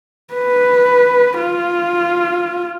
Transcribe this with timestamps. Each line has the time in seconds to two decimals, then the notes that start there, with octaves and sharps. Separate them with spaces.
0.34 B4
1.39 F4